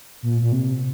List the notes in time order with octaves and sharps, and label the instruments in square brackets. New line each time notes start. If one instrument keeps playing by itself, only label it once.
[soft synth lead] A#2
A#2
C3